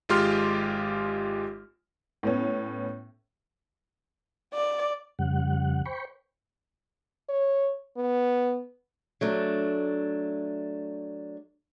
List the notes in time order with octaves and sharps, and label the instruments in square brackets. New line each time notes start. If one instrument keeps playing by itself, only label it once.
[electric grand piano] G#1 G#3 F4 G4 C6 F6
[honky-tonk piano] A2 B3 C#4
[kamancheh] D5
[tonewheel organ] F2 C#3 G3 F#5
C5 G5 B5 C#6
[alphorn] C#5
B3
[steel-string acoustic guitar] F#3 A3 D4